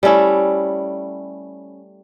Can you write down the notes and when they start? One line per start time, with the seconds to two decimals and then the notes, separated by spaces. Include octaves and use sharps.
0.03 G3 A3 C#4 E4